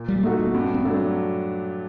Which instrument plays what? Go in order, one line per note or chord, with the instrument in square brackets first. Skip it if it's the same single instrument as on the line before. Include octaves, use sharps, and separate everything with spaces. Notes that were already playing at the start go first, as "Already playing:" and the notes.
Already playing: [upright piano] A#2
[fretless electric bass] G3
[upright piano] A3 D#4 F#4 [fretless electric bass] A#3
[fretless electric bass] A#3
[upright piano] G2 [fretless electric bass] C4
[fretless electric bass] C4
[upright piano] F#3 A3 D4